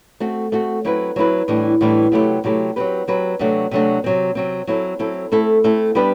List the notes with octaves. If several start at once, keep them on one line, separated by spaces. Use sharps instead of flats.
A3 C4 F#4
A3 C4 F#4
F#3 C4 E4 B4
F#3 C4 E4 B4
A2 E3 G3 D4
A2 E3 G3 D4
C3 F#3 A3 E4 G4
C3 F#3 A3 E4 G4
F#3 C4 G4 B4
F#3 C4 G4 B4
C3 F#3 A3 D4 F#4
C3 F#3 A3 D4 F#4
C3 F#3 C4
C3 F#3 C4
F#3 C4 E4 A4
F#3 C4 E4 A4
A3 C4 E4 A4
A3 C4 E4 A4
G3 B3 D4 G4 B4